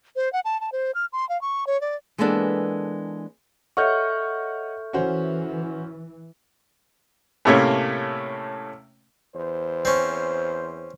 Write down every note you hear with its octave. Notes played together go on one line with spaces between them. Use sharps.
C5
F#5
A5
A5
C5
F6
C6
F5
C#6
C#5
D5
E3 G#3 A#3 B3 D4 A4
A4 C#5 D#5 E5 F#5 C#6 F6 G6
E3 C#4 F#4 C5
A2 C3 A3 A#3 C#4
E2 C5
C4 C#4